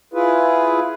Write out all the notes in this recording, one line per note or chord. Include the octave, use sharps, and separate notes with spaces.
E4 F4 G#4 B4